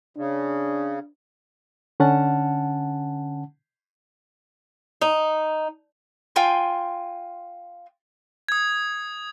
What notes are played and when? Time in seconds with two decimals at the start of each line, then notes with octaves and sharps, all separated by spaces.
0.17 C#3 D4
2.00 D3 C#4 F#5 A5
5.02 D#4
6.36 F4 G5 G#5 C6
8.49 D#6 G#6